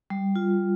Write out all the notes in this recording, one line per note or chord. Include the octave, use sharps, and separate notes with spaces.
G3
F4